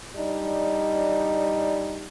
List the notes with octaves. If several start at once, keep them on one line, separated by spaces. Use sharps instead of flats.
G3 D4 D#4